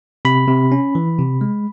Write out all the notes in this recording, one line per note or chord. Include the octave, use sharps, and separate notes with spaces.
C3 B5
C3
C#4
E3
C3
G#3